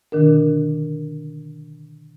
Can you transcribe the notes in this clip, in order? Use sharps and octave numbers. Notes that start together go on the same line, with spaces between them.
B2 D3 D#3 D4 A#4